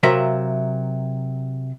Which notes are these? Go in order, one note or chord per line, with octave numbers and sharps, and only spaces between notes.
C3 F#3 A#4 E5 F5